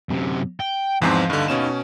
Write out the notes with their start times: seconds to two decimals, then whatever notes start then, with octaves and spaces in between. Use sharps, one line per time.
0.09 F#2 C3
0.60 G5
1.02 E2 G#2 F3 C4
1.30 G2 D3 D#4 F5
1.48 B2 C#4 E7